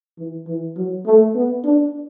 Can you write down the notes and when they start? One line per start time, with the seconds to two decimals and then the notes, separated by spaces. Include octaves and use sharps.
0.18 E3
0.48 E3
0.77 F#3
1.06 A3
1.35 B3
1.64 D4